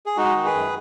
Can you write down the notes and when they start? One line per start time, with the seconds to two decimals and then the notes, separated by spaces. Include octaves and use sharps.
0.06 G#4
0.17 G#3 D#4 F#4
0.36 D#3
0.45 G#4 B4
0.55 F#2